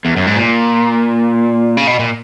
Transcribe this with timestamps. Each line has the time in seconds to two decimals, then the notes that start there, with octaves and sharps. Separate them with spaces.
0.05 E2
0.17 F#2
0.27 G#2
0.36 A#2
1.77 C#3
1.88 B2
1.99 A#2